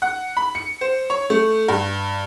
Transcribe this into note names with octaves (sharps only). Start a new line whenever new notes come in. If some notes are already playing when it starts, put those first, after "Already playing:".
F#5
B5
C#7
C5
C#5
A3
G2